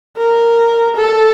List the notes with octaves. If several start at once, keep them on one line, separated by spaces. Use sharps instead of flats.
A#4
A4